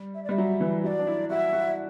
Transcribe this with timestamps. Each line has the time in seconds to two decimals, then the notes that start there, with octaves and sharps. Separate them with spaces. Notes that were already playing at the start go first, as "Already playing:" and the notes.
Already playing: G3
0.14 E5
0.24 D5
0.29 G3 E5
0.38 F#3
0.61 E3
0.83 F#3 D5 E5
0.99 D4
1.07 E4
1.30 F#4 E5
1.53 F#4